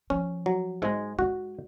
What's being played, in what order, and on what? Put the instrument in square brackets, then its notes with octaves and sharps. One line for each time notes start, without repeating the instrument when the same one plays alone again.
[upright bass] F3 [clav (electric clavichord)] C#4
[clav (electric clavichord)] F#3
[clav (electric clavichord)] G#2 [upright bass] G#3
[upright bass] G#3 [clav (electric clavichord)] F#4